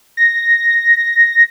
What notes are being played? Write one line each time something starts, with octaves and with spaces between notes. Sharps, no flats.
A#6